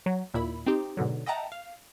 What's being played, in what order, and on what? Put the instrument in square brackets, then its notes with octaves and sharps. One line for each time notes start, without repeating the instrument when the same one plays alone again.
[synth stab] F#3
D#2 A#2 E4 B5
C4 D#4 G4
G#2 B2 D3 F#3
D#5 E5 F#5 G5 A5 A#5
F5